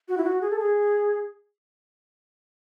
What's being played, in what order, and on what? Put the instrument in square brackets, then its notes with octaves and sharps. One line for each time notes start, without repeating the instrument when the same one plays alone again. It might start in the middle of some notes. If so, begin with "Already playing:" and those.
[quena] F#4
E4
F#4
G#4
A4
G#4